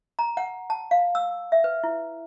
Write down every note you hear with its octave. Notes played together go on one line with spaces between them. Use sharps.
A#5
F#5
A5
F5
E6
E5
B4
E4